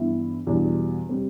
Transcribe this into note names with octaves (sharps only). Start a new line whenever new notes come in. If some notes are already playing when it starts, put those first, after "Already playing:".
Already playing: G2 E3 B3 E4
E2 B2 G3 D4 F#4
C3 G3 C4